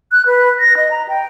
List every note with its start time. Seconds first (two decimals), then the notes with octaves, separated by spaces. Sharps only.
0.12 F#6
0.26 B4
0.60 A#6
0.77 D#5
0.91 A#5
1.08 G5